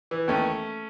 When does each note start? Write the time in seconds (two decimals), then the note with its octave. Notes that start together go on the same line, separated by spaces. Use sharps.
0.11 E3
0.28 D#2 A3 C#4